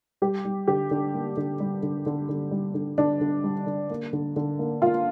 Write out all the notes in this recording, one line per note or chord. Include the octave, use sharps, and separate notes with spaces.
G3 G4
G3
D3 G4
D3
A#3
D3
G3
D3
D3
D3
G3
D3
D3 D4
D3
G3
D3
A#3
D3
D3
A#3
A#3 F4